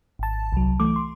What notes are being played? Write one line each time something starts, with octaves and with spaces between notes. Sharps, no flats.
G#1 A5
C2 F#3
E3 A3 D6
C6